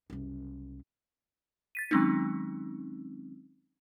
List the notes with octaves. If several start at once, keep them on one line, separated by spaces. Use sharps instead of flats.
F#1 C2
A6 B6 D#7
D#3 F#3 G#3 C4 C#4 D#4